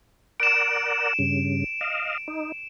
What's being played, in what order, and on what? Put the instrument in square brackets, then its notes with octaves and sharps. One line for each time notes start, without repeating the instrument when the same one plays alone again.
[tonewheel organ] A#4 D5 F#5 [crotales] D7 E7
[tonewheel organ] G2 C#3
D#5 F5
D#4